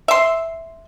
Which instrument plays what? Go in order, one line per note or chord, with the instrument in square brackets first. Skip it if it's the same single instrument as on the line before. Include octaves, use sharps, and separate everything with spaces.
[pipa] E5 C6